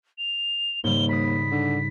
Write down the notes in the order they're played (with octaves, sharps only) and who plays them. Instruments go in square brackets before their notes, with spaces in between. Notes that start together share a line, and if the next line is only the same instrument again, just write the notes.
[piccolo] F7
[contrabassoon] D#2 [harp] G#2 C#3 G3 [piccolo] G7
[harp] B5 D#6 [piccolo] B6
[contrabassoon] D3